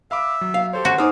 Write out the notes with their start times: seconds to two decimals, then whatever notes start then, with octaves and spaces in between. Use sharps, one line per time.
0.11 E5 F5 B5 D6
0.41 F#3
0.54 F5
0.73 G4 A4 C5 C#5
0.85 F#4
0.98 D#4 G#4 C5 D6 D#6 F6